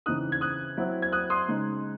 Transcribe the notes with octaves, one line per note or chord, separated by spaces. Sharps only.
C#3 E3 C4 D#4 D#6 F#6
G#6
D#6 F#6
F#3 C4 E4
G#6
D#6 F#6
C6 D#6
C#3 G#3 D#4